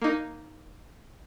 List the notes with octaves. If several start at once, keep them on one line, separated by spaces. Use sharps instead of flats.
A#3 D#4